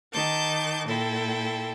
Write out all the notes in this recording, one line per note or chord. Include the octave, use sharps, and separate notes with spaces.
D#3 A5 D6 G6
A#2 E4 A4 G5